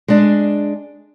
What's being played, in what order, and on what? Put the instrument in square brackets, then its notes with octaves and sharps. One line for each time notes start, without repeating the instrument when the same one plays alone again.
[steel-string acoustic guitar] G#3 D4